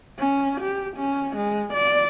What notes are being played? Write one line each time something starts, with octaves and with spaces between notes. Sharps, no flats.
C#4
G4
C#4
G#3
D5